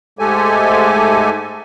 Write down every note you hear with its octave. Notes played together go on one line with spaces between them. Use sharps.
G#2 G#3 A3 G4 A4 G#5